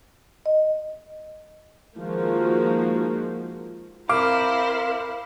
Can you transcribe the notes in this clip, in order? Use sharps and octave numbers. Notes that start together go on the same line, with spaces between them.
D#5
D#3 F3 G#3 A#3 F#4
C4 E4 A#4 F5 D6